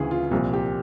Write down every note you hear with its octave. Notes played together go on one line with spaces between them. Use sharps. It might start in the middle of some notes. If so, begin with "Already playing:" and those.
Already playing: D2 C#3 E3 G#4
F4
C2 A#2 F3
G4